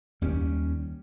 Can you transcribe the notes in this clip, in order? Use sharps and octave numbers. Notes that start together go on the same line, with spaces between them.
D#2 G3 C#4